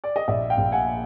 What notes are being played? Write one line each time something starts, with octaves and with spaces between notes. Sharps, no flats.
D5
D#5
A#1 D5 E5
F5 G5
A#1
F#5 G#5